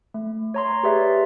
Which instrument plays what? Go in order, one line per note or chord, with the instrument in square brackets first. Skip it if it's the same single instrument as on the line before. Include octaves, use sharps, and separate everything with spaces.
[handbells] A3
C#5 A#5 C6
G4 G#4 B4 D5 E5